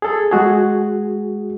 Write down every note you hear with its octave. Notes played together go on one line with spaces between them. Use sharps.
G#4 A4
G#3 F#4 G#4